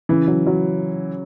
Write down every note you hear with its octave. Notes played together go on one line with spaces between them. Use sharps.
C#3 E3
F#3
F#3